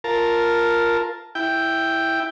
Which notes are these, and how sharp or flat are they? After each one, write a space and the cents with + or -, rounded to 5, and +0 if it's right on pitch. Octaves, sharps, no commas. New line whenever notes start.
F4 +0 A#4 +0 A5 +0
E4 +0 G5 +0